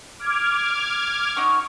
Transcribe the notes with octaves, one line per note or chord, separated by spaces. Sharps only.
D6 F6 G#6
D#4 F#4 C#6